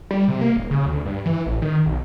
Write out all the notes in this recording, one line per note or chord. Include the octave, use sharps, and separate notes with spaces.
G3
C3
A#3
D#1
C#3
D2
G2
E3
A1
D#3
B1